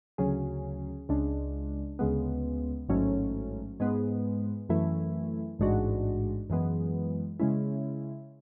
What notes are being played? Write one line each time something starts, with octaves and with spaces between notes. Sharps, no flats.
D2 C#3 F#3 C#4 G#4
C#2 C#3 G#3 D4
D2 C#3 G#3 B3
A1 G#2 F#3 A3 C#4
G#2 G#3 B3
F#2 E3 A3 E4
A1 G#2 G#3 D4 F#4
F#2 E3 G#3 B3
C#3 G#3 C#4 E4